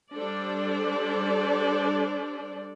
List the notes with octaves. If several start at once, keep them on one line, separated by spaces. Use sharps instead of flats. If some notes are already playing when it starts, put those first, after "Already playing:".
G3 D4 A4 C5 D5